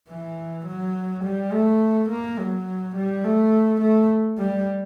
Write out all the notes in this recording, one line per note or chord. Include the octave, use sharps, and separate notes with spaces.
E3
F#3
G3
A3
A#3
F#3
G3
A3
A3
G3